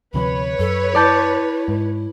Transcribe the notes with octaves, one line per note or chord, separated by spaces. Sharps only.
D2 C3 F3 B4 C#5 B5
F#2 A4
E4 D5 A5 G6
G#2